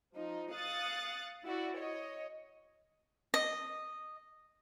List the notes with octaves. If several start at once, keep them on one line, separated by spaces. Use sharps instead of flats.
F3 D#4
F5 D#6 F#6 A6 C#7
E4 F#4 D5
C#5 D#5
D#5